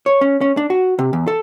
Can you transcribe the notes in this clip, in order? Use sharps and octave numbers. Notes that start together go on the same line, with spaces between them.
C#5
C#4
C#4
D4
F#4
C3
E2
A4